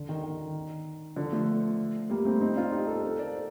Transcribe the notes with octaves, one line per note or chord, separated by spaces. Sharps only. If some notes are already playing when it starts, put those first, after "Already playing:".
Already playing: D3
D#3
D#3
D3 F3
F3 A3
G3 A#3
A3 C4
C4 D#4
D4 F4
D#4 G4
A4 C5
A4 C5
A#4 D5